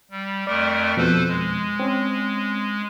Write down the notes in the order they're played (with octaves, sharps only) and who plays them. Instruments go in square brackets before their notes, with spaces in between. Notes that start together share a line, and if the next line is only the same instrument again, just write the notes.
[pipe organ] G3
[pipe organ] F2 A3 A#4 [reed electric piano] D5
[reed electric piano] F2 B2 [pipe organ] A4 B4 C5
[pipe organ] G#3
[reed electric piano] C4 C#4